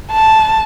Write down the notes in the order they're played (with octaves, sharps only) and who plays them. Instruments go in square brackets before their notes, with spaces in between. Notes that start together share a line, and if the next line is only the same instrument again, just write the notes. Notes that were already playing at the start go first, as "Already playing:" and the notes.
[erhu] A5